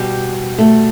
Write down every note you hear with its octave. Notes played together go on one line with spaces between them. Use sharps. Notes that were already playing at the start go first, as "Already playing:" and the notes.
Already playing: B2 G3 G4
A3